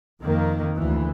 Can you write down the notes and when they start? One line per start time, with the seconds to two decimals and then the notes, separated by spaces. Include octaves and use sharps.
0.21 F2 D#3 A#3
0.77 D2 E3